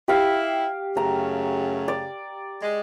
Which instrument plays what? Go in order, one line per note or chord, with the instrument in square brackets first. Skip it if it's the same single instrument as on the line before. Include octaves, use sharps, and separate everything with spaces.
[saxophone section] E4 [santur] G4 F5
[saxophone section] F#2 C#3 A3 [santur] A#5
[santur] D5
[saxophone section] G#3